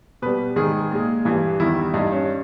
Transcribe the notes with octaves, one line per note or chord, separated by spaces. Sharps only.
B2 G3 B4
G#2 D#3 G#3 G#4
A#2 G#3
G2 E3 G3
E2 D#3 G3 E4
G2 G3 D#4
C#4